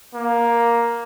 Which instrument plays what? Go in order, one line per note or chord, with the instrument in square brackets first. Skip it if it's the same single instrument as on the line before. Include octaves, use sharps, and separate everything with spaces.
[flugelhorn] A#3